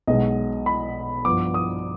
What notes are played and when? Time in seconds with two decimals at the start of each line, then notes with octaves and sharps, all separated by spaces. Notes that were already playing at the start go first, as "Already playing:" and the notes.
0.07 B1 B2 G#3 B3 D#5
0.66 B5
1.25 G2 F3 B3 D6
1.54 D#6